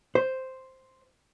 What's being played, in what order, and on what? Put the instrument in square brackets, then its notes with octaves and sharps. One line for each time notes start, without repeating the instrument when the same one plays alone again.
[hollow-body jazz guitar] C5